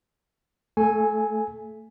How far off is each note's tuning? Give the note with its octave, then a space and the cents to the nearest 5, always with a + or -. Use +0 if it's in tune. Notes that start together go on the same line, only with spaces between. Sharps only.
A3 +15 A4 -30 G#5 +0